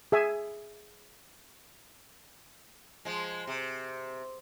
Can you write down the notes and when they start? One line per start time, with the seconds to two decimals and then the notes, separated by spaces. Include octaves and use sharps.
0.12 G#4 E5 G#5
3.05 F3 G#3
3.47 C3